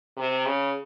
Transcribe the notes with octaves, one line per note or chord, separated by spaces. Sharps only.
C3
C#3